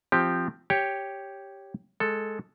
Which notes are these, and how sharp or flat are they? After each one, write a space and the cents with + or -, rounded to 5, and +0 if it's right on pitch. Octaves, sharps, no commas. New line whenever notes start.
F3 -5 C4 +0 G4 +0
G4 +0 C#5 +0 G5 +0
G#3 +15 A4 +0